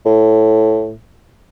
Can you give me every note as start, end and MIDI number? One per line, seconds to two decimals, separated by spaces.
0.05 0.93 45